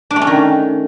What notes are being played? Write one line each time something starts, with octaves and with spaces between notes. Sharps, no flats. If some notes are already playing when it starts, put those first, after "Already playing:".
D4
A3
C#4
D#3